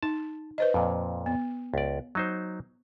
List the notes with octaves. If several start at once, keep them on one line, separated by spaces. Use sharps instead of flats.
D#4 A5
B4 C5 D#5
F2 A#2
B3
C#2 D5
F#3 D#4 C5